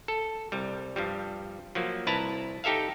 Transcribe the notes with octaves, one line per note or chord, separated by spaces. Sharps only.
A4
C2 G3
G2 F3 G3
F3 F#3 A#3
C2 E4 B4 A5 A#5
D#4 G4 A4 E5 F5